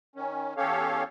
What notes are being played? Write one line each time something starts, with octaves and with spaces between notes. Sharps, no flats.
D#3 C#4
E2 C#4 G4 A4 C#5 F5